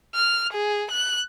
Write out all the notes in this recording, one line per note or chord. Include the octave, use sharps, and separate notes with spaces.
F6
G#4
F#6